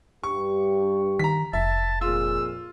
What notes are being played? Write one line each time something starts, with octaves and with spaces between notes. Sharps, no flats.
G2 G4 C#6
D#3 A#5 B6
F1 E5 A5
F2 A#2 F4 G#4 E6